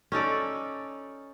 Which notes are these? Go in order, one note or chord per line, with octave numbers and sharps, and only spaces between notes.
C#4 D#4 A4 D5